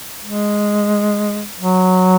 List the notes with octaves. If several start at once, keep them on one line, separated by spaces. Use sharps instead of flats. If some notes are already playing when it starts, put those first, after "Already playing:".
G#3
F#3